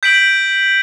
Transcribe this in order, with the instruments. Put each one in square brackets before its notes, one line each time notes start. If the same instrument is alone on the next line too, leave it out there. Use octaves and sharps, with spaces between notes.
[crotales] G6 B6 D7 F#7